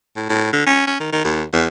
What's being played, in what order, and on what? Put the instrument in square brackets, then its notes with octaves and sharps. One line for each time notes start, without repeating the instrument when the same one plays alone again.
[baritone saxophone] A2
A2
D3
C#4
C#4
D#3
D#3
D#2
E2